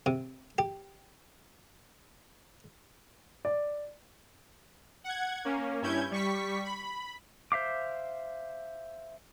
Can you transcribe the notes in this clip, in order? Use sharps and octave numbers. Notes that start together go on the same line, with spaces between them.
C3
G4
D5
F#5 G#6
A#3 C#4
G2 C#4 E4 G6 G#6
G3 C#6 B6
B5
C5 E5 F5 D6